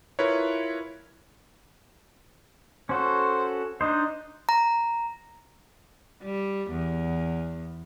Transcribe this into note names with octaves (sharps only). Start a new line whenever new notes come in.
E4 F4 A#4 B4 C#5
C#4 F#4 A4 C5
D4 D#4 C5 D#5
A#5
G3
E2